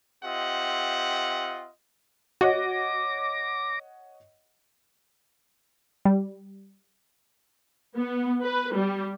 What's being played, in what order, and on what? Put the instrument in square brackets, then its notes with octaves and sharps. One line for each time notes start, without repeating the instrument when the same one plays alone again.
[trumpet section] C4 F4 G4 D#5 E5 F#5
[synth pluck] F#4 [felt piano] C#5 D#5 F#5 [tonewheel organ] D6 A#6
[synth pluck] G3
[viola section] B3
B4
G3